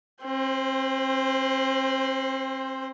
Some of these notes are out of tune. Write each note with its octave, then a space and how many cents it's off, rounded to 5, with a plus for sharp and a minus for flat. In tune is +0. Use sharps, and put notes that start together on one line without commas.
C4 +35 C5 +0